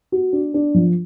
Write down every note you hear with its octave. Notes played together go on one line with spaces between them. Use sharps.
F#4
D4
D4
F3